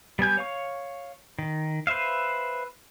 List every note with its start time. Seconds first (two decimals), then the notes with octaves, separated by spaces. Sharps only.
0.19 G3 B3 G#5 G6
0.37 C#5 F5 C#6
1.39 D#3
1.87 B4 C5 E5 F5